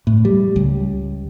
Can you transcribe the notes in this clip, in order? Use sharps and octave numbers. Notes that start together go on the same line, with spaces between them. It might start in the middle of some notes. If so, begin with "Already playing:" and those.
A2
G3
C#2